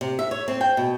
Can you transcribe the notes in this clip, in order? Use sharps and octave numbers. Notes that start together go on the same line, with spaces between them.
C3
E5
C#5
C4
G5
B2